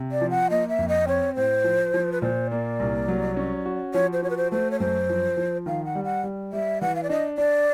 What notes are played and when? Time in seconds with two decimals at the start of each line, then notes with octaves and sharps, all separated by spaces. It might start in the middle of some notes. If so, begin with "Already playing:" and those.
Already playing: C3
0.12 D5
0.21 F3
0.30 F#5
0.50 A#3 D#5
0.69 E5
0.79 F2
0.88 D#5
1.07 C4 C#5
1.35 A2 C5
1.64 F3
1.94 F3
2.12 B4
2.22 A#2 C5
2.50 A#3 D5
2.80 C2
3.08 F#3
3.37 C#4
3.66 F#4
3.94 F3 C#5
4.13 C5
4.22 F#4 C#5
4.30 B4
4.37 C5
4.52 A3 C5
4.71 C#5
4.80 F#2 C5
5.10 F3
5.37 F3
5.66 D#3 F5
5.85 F#5
5.95 G3
6.04 F#5
6.24 G3
6.53 G3 E5
6.81 E3 F#5
6.96 F5
7.03 D5
7.09 D4 D#5
7.38 D4 D5